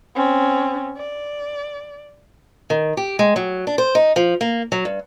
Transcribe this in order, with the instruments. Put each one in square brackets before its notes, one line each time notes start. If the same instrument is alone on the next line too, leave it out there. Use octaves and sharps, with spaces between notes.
[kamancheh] C4 C#4
D5
[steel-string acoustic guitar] D#3
G4
G#3
F#3
D4
C5
D#4
F3
A#3
F#3
G2